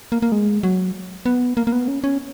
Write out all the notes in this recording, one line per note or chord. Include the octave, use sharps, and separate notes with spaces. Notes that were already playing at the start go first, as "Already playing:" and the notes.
A#3
A#3
G#3
F#3
B3
A#3
A#3
B3
C#4
C#4